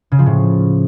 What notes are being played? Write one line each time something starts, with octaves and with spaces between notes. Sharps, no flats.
C#3
F3
A2